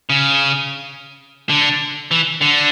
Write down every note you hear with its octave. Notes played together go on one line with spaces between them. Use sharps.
C#3
D3
E3
D3